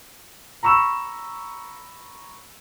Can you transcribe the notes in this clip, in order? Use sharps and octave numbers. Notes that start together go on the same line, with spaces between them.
A#5 B5 C#6 E6 E7